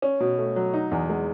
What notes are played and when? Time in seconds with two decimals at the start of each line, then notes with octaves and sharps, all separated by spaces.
0.02 C#4
0.20 B2
0.38 A3
0.56 F#3
0.74 D#4
0.91 E2
1.09 G#3